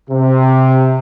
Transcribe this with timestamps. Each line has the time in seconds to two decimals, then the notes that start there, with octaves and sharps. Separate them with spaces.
0.10 C3